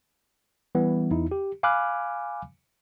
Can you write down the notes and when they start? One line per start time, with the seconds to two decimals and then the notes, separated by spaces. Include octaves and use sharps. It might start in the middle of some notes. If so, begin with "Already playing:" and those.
0.75 E3 G3 B3
1.11 E2 D#4 E4
1.31 G4
1.63 F5 G#5 B5 D6 F6 F#6